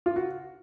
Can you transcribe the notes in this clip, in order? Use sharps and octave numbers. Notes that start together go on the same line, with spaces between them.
F4
F#4